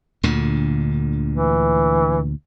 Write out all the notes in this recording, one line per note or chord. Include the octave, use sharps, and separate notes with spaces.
D2 A#2 D3
E3